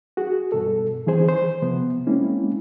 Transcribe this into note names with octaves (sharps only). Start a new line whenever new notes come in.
F#4 G#4
G2 B2 A4
D#3 E3 C4 G#4 C5
C5
C3 F3 B3
G#3 A#3 C4 C#4 E4